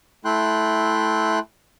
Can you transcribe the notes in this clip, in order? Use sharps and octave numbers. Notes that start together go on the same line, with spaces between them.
A3 E4 G5 C6 F#6